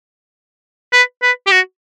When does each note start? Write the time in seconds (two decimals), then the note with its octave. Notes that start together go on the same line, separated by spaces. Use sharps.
0.93 B4
1.22 B4
1.47 G4
1.51 F#4